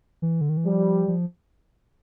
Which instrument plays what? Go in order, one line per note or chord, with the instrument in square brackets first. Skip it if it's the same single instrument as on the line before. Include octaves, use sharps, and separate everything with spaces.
[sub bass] E3
D3
D#3
E3
[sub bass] F3 [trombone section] G3
[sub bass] F3